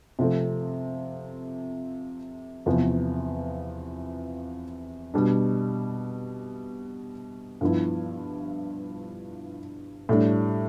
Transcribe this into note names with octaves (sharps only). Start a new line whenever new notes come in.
C3 F3 A3 C4
E2 C3 F3 B3
B2 G3 D4
G2 F3 B3 E4
A2 G3 D4